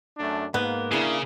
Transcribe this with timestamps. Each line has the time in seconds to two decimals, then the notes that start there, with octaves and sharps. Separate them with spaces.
0.18 F#2 A3 D4
0.54 G#2 A#3 B3
0.92 C#3 D4 E4 G#4